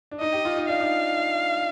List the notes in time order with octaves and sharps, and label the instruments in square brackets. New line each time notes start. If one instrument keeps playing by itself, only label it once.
[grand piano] D4
[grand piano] D#4 [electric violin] D#5
[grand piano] G4
F4
D#4
[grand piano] D4 [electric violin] F5
[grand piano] D#4